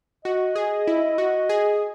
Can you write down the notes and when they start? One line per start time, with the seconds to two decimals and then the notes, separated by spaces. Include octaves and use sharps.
0.25 F#4 D#5
0.56 G#4
0.88 E4
1.18 F#4
1.49 G#4